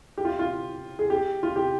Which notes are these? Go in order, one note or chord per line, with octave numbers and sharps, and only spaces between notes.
G4
F4
F4
G#4
G4
F4
G4